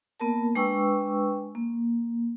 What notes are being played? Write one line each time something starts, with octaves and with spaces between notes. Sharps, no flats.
A#3 B3 A#4 A5
G#3 D4 B4 G5 C#6 E6
A#3